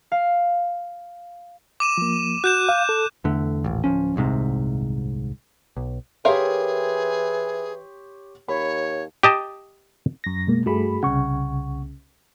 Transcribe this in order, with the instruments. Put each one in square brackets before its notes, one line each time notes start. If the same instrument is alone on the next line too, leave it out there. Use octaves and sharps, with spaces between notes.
[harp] F5
[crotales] D6 D#7 E7
[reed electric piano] F3 A#3
[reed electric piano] F#4 [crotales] F#6 G6 E7
[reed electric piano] F5
A4
[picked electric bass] E2 D3 A3
D#1 A1
D1 C#2 F3 C#4
D#1 C2 G#2 C3
B1
[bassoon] E3 [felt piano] G4 C#5 C6 [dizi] G#4 [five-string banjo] A#4 E5 F5
[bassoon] D#2 [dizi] C#5 [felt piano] B5
[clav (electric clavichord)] G4 D#5 A5
[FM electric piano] F#2 A#6
[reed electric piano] B2 G#3 A#3
[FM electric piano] G2 A3 B5 [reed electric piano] F#4 G#4
[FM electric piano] C2 C#3 [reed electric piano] F#5 C#6